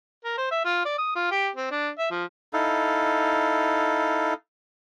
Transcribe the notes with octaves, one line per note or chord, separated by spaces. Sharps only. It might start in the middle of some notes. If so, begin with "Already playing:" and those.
A#4
C5
E5
F4
D5
D#6
F4
G4
C4
D4
E5
F3
D#4 E4 A4 F5